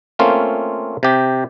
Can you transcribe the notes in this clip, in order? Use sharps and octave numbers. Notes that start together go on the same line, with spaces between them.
A3 A#3 C4 C#4 F4
C3 G4